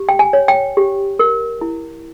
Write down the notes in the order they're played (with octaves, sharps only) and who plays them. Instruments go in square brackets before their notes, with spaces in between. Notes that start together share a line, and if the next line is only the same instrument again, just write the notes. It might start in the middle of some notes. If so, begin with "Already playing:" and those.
Already playing: [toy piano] G4
G5
G#5
C#5
G5
G4
A#4
E4